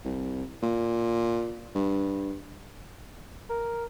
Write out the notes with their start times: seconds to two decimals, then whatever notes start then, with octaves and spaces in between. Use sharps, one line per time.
0.05 C2
0.63 A#2
1.75 G2
3.50 A#4